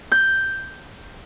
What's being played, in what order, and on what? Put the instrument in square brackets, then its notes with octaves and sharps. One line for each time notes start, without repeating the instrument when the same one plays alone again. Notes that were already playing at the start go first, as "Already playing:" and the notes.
[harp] G6